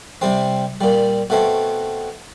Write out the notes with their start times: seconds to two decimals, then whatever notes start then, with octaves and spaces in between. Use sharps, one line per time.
0.21 C3 G3 C4
0.81 A#2 G3
1.30 B2 A3 C4